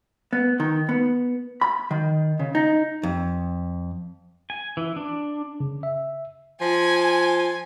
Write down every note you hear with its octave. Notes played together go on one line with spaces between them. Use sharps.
B3
D#3
B3
B5
D#3
C#3
D#4
F2
G#5
E3
D4
C#3
E5
F3 G#5